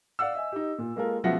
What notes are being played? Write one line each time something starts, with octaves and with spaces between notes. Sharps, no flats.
D5 F5 F#5 E6
D#5 E5 G#5
D#4 G4
A#2
G#3 A#3 F4 A4 A#4
C#2 B2 F3 E5 F#5 A#6